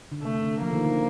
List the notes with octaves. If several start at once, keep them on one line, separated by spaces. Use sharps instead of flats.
D3
C3 A3
D3
F3 A#3
D#3
D3